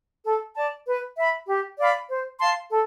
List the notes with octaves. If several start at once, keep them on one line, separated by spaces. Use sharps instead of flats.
A4
D5 A5
B4
E5 B5
G4
D5 F5 B5
C5
F5 A5 C6
A4